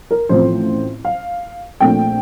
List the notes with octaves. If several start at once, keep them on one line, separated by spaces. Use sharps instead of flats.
A#4
A1 A2 F3 C4 C5
F5
A#1 A#2 A3 C4 G5